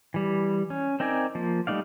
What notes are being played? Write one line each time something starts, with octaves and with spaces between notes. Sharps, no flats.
E3 G3
C#4
C4 D#4 A#4 D5 G#5
F3 A#3
G3 A3 D#4 D5 F5